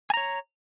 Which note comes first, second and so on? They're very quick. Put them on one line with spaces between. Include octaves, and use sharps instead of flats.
G#5 A#5 C#5